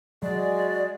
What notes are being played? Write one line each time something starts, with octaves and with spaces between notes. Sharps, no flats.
F#3 G#3 F#4 D5